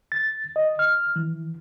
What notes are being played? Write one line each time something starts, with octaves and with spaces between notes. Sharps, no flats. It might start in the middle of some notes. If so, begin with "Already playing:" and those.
A6
D#5
F6
E3